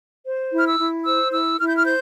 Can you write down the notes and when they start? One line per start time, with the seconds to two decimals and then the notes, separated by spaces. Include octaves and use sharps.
0.25 C5
0.51 E4
0.58 F6
0.66 E6
0.79 E4
1.05 C5 E6
1.32 E4 E6
1.58 E4 F6
1.68 G6
1.76 F6
1.85 C5 G6